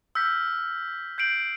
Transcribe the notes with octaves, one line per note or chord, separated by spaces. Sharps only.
E6 F6 G6 B6
G6 C7 D7 F#7